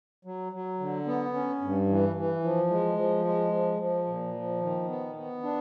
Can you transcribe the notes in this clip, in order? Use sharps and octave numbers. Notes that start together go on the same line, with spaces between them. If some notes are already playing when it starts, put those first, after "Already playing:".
F#3
F#3
D3
B3
C#4
G2
E3
E3
F3
G#3
F3
G#3
F3
F3
A#2
F3
D#3
B3
B3
D4